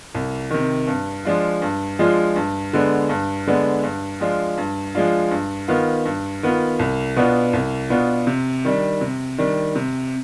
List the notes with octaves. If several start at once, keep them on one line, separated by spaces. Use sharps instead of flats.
C2
C3 D#3
G2
F3 G#3 D4 F4
G2
F3 G#3 D4 F4
G2
D3 G#3 B3 D4
G2
D3 G#3 B3 D4
G2
F3 G#3 D4 F4
G2
F3 G#3 D4 F4
G2
D#3 B3 F4
G2
D#3 B3 F4
C2
B2 B3 D4 F4
C2
B2 B3 D4 F4
C3
D#3 G3 D4
C3
D#3 G3 D4
C3